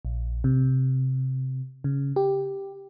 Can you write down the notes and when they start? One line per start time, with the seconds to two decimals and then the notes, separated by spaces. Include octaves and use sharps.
0.05 A#1
0.44 C3
1.84 C#3
2.16 G4